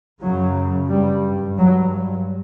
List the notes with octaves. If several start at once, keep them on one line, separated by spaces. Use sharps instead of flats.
F#2 C#3 F#3
G2 G3
G2 F#3